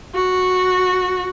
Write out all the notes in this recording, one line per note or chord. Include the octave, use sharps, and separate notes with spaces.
F#4